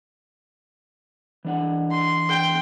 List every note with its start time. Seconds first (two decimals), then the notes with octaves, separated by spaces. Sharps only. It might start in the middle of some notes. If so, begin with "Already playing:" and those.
1.45 E3 D4 F#5
1.91 C6
2.29 G5